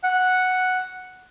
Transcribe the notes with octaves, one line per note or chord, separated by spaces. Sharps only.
F#5